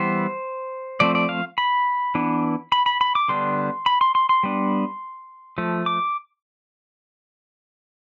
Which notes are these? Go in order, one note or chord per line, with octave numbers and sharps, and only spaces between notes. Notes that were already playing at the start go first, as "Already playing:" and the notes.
Already playing: E3 G3 B3 C5
F3 A3 C4 D5
D5
F5
B5
E3 B3 D4
B5
B5
B5
D6
D3 G3 B3 D4 C6
B5
C6
C6
C6
G3 B3 D4
F3 A3
D6